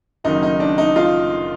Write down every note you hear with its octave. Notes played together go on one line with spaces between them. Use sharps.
F#1 F#2 D#3 D#4
D#4
D4
D#4
D#4 F4